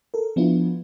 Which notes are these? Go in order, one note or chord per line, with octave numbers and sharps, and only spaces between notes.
A4 A#4
F3 B3 D4 E4 F4